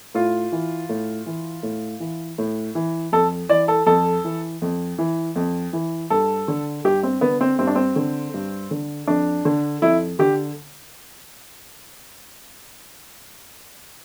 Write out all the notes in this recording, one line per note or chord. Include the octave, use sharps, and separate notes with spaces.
A2 F4
E3
A2
E3
A2
E3
A2
E3
F2 A4
E3 D5
A4
F2 A4
E3
F2
E3
F2
E3
G2 A4
D3
G2 G4
C4
D3 B3
C4
G2 C4
D4
C4
D3
G2
D3
F2 D4
D3
F2 E4
D3 G4